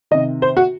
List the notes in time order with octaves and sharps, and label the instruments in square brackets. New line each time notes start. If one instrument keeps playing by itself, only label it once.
[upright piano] C3 D#3 D#5
C5
F#4